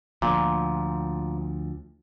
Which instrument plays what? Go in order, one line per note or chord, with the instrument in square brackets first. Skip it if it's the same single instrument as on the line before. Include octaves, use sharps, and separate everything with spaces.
[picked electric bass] D2 F3 [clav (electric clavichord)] A#2